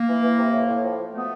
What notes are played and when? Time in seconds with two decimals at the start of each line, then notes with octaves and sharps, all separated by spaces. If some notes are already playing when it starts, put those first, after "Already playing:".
Already playing: A#3
0.08 E3
0.22 E3
0.38 C3
0.53 A2
0.68 A2
0.83 F3
0.99 F3
1.13 B2 A3 B3